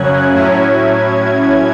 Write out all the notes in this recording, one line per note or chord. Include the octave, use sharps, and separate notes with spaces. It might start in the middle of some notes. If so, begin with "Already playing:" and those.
Already playing: F#2 C#3 F#3 C#4 F#6 G#6
A2 F#3 C#4 E4